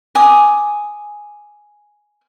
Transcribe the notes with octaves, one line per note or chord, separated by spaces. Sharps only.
G#5 D6 D#6